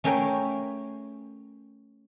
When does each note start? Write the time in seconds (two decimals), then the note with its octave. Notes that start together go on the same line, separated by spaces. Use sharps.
0.04 A3 C#4 G#4 A#4 G5